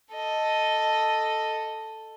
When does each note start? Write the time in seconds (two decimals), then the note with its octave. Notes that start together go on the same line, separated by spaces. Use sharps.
0.15 A4 D#5